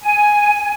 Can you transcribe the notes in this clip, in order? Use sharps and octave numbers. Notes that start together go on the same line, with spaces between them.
G#5